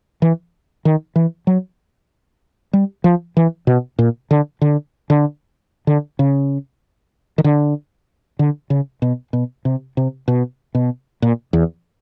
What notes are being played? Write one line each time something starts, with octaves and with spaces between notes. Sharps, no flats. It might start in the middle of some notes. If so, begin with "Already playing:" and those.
E3
D#3
E3
F#3
G3
F3
E3
B2
A#2
D3
D3
D3
D3
C#3
D#3
D3
D3
C#3
B2
B2
C3
C3
B2
B2
A#2
E2